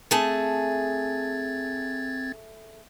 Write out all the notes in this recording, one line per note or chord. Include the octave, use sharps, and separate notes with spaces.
A3 C4 G#4 A5 G#6 A6